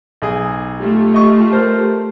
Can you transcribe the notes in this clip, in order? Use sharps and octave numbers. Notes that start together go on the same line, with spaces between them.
B1 G#4
A3 F4 G4
D#5 C#6
A#4 C5 A5